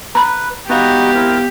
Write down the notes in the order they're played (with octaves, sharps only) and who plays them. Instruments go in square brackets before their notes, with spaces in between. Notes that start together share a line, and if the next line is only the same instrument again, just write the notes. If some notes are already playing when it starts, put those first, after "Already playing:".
[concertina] B4 [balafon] A#5 B5
[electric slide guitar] B3 F5 [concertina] D#4 F#4 B4 [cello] G4
[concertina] C4 E4 A#4